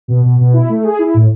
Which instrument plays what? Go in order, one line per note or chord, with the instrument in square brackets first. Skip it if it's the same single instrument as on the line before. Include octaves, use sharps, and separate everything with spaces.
[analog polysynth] B2
B2
B2
E4
A3
G#4
E4
A2